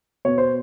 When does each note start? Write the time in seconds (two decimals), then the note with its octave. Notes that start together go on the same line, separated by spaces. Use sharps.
0.25 B2 C#5
0.38 C5